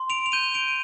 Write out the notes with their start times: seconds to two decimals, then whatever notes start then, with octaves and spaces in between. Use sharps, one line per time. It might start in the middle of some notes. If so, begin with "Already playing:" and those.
Already playing: C6
0.10 D7 F7
0.26 F7
0.32 G6 D#7 G7
0.54 D7 F7
0.68 D#7